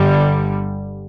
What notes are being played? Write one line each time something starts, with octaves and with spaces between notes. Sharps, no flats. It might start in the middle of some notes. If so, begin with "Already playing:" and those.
Already playing: G1 G2 D3 G3